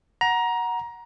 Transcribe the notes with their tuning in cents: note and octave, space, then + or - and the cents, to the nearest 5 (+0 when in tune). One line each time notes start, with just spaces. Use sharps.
F#5 +0 A#5 +20